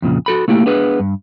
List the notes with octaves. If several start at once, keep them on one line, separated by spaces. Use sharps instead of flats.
F2 A#2 C#3
F#4 A4 B5
A3 A#3 E4 G4
B3 D4 G#4 B4
G2